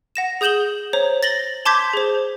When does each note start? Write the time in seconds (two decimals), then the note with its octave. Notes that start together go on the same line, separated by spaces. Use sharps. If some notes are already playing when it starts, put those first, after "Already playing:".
0.16 F#5 A#6 E7
0.41 G#4 D#6 G6 E7 F#7 G7
0.93 C5 C#5 A#5
1.23 A6 A#6 F#7 G7
1.66 A5 C6 D6 G6 G#6 B6
1.93 G#4 C5